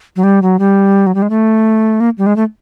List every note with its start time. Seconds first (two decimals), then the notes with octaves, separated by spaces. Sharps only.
0.16 F#3
0.23 G3
0.42 F#3
0.59 G3
1.06 F#3
1.15 G3
1.22 G#3
1.30 A3
2.00 A#3
2.18 G3
2.26 G#3
2.36 A3